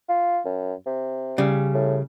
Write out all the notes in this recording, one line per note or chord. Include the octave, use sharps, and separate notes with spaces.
F4
F#2
C3
C#3 G3
A2